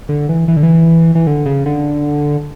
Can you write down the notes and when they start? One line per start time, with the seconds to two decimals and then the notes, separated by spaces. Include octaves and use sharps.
0.09 D3
0.29 E3
0.48 E3
0.56 D3
0.63 E3
1.15 E3
1.27 D3
1.46 C#3
1.66 D3